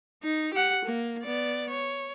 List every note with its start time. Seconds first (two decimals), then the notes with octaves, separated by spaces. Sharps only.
0.23 D#4
0.54 G4 F#5
0.85 A#3
1.23 B3 D5
1.70 C#5